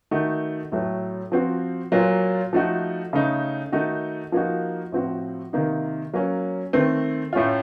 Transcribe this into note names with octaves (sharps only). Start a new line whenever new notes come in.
D#3 A3 D#4 F#4
A2 F#3 A3
F3 C4 F#4
A#2 F#3 A#3 F4
F3 A3 D#4 F#4
C#3 A3 D#4
D#3 A3 D#4 F#4
F3 A#3 D#4 F#4
A2 F3 C4 F#4
C3 D#3 A#3 D#4
F#3 A#3 C#4
D#3 A3 C4
A2 A3 C#4 F4